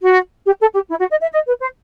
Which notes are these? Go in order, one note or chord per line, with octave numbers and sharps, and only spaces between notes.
F#4
G4
A4
G4
E4
F#4
D#5
E5
D#5
B4
C5